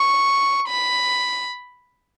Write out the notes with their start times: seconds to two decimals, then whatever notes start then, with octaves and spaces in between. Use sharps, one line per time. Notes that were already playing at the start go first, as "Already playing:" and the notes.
Already playing: C#6
0.68 B5